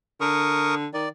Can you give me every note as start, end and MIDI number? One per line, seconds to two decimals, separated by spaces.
0.21 0.87 50
0.21 0.75 70
0.21 0.75 85
0.21 0.75 87
0.94 1.08 51
0.94 1.09 74